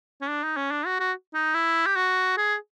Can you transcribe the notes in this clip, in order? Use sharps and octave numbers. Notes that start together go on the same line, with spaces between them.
C#4
D4
D#4
C#4
D4
F#4
F#4
D#4
E4
G4
F#4
G#4